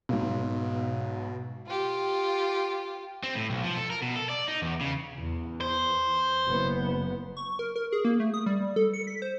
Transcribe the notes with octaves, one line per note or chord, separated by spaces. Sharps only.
B1 G#2 B2
F4 G4
C4
A2
B1
F3
A4
A#4
B2
A4
D5
D#4
E2
C#3
E2
C5
F#1 B3
C#6
A#4
A#4
G#4
A#3
A3
D#6
G3
A4
C#7
B6
C5